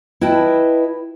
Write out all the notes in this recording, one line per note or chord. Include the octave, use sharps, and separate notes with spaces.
E4 B4 D#5 G5 A5